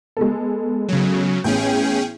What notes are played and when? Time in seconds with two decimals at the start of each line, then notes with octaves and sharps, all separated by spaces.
0.17 G#3 B3 A4
0.89 C#3 F#3
1.44 A1 B3 C#4 G#4 G5